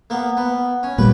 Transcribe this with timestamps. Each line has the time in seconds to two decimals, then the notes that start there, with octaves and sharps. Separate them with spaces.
0.10 A#3 B3
0.37 B3
0.83 C#4
0.98 A#2 G3 B4 G5